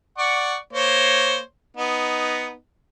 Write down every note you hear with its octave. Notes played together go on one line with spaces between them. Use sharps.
D5 F#5 C#6
A#3 C5 C#5
B3 D#4